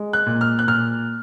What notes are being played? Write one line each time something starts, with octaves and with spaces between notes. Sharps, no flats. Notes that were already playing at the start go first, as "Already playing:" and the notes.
Already playing: G#3
F#6
A#2
F6
F#6
A#2 F6